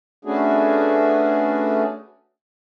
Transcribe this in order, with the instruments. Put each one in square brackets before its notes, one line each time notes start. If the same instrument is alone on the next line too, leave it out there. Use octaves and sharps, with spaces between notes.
[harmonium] A3 B3 C#4 D4 F#4 G#4